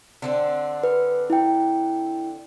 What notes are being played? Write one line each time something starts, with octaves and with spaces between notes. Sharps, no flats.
D3 C4 D4
B4
E4 G5